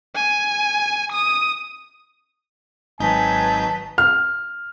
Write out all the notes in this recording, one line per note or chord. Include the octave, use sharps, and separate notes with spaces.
G#5
D#6
G#1 F#3 D#4 B4 G#5 A5 G6
F6